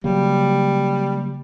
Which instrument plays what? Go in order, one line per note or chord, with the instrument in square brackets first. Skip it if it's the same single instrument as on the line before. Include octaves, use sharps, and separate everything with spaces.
[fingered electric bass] C#3 F#3 A#3 [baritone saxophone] G3